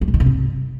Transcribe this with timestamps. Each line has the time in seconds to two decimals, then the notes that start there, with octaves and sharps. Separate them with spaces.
0.01 G3
0.08 A#2
0.14 D#3
0.20 C3
0.26 G2